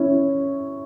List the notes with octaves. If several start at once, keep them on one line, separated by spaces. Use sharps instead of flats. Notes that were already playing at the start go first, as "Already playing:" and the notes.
Already playing: C#4 E4